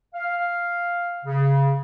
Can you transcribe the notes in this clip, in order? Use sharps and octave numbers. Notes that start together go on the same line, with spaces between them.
F5
C#3